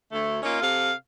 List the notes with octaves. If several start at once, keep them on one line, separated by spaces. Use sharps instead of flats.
D2 A3
A#3 C#4 D#4 F4
C3 A4 F5